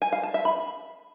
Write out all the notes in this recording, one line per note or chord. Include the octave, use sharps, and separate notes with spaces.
G#5
F5
A5
E5
B5